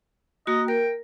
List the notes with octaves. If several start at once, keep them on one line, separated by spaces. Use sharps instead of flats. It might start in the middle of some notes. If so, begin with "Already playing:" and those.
A#3 F#4 D#5
A#4 G5